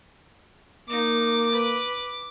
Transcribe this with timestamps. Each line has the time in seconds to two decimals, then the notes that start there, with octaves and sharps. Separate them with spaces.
0.89 A#3 D#4 D6
1.51 B4